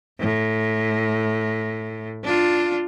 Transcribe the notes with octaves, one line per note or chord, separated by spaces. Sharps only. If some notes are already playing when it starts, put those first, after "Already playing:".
A2
D4 F4